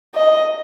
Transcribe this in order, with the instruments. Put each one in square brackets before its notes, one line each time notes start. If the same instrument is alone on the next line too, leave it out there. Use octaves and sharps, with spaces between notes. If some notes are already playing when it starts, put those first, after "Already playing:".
[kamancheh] D#5